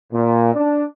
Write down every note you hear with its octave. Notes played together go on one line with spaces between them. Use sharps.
A#2
D4